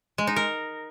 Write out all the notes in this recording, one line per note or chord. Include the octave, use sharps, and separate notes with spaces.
G#3
D#4
A#4